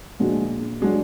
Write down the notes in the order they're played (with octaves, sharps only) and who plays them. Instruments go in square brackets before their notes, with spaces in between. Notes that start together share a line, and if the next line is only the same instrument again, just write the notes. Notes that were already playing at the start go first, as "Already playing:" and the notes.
[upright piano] A#2 [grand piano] D3 F3 G#3 D4 F#4
[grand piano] F#3 D4 F#4 D5 [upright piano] G#3